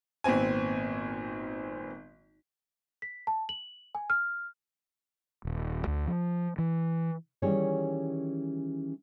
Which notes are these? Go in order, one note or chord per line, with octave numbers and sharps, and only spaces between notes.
G#1 A#2 B3 C4 G#5
B6
A5
F#7
G#5
F6
D#1
D2
F3
E3
D#3 E3 G3 C#4 G#4 C#5